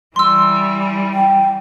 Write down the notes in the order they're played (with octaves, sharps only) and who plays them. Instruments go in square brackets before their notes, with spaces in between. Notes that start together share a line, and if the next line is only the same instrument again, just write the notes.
[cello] E3 G3 [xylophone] C6 E6
[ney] G5